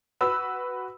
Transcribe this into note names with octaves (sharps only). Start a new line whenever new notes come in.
F#4 B4 B5 E6